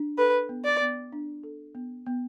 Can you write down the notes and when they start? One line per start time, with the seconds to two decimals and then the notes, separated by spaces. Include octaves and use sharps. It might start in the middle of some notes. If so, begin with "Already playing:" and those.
Already playing: D4
0.18 A4 B4
0.49 B3
0.65 D5
0.81 B3
1.12 D4
1.43 A4
1.75 B3
2.06 B3